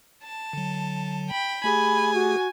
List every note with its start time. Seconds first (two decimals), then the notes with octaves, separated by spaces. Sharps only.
0.23 A5
0.53 D3 F#3
1.30 G5 B5
1.64 A3 G4 G#4 G#5 B5
2.14 F#4